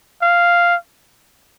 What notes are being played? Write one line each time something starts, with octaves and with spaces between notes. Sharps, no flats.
F5